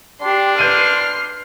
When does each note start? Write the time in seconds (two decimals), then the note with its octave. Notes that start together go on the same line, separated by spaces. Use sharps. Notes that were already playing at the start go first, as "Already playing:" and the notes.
0.21 D4 G4 C6
0.59 B4 C6 F6 G6 D#7